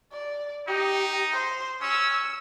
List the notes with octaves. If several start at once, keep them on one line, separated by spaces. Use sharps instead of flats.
D5
D#4 G4
C5
C#4 E6